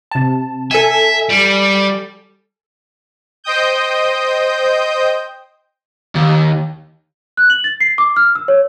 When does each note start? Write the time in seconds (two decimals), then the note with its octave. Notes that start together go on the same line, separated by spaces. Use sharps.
0.11 C3 A5
0.71 A4 E5 G#5
1.29 G3
3.44 C5 D#5 G5 D#6 G6
6.16 D#2
7.37 F#6
7.50 F#7
7.64 A6
7.80 C7
7.98 D6
8.16 F6
8.35 E6
8.48 C#5